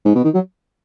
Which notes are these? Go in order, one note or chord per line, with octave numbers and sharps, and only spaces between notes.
G#2
B2
D#3
F#3